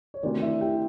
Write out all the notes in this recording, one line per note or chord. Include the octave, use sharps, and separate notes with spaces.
C#5
D2 C3 D#3 D5
E4 E5
G4 G5